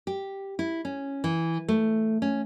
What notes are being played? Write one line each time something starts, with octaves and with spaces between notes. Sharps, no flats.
G4
E4
C#4
E3
A3
C#4